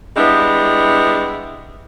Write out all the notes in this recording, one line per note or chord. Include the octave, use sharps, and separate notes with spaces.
G3 G#3 B3 D4 E4